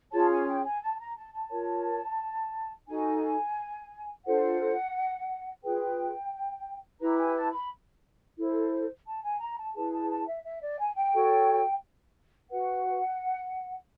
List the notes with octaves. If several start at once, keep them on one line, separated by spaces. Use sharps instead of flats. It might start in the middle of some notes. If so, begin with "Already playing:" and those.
C#4 F4 G#4 C#5 A5
G#5
G5
G#5
A5
A#5
A5
A5
F4 A#4 C#5
D#4 F#4 A4 G#5
D4 F4 A4 C5 F#5
F4 G#4 B4 G5
E4 G4 B4 A#5
G#5
A5
B5
E4 A4 C5
A5
G#5
A#5
A5
E4 G#4 B4 A5
A5
A5
E5
E5
D5
G#5
G5
F#4 A4 C#5
F#4 B4 F#5